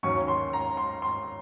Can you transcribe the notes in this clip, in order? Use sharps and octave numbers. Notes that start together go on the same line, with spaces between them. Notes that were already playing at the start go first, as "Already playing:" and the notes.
D#2 D#3 F#3 C#4 C#6
C6
A#5
C6
C6